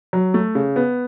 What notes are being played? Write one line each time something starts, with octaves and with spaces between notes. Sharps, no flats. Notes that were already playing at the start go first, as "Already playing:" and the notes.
F#3
A3
C#3
B3